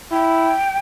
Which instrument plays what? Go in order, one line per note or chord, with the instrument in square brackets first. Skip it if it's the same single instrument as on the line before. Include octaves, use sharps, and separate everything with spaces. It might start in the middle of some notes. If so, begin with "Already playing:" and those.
[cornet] E4 [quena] G5